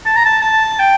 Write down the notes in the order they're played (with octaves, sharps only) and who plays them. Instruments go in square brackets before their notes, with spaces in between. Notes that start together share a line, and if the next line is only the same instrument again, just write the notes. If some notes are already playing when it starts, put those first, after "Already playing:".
[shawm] A5
A#5
A5
A5
G5